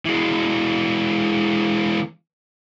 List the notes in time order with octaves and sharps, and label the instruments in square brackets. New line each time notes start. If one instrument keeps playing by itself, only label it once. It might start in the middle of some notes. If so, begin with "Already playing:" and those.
[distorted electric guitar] E3 G#3